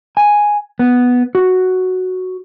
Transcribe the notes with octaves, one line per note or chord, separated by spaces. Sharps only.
G#5
B3
F#4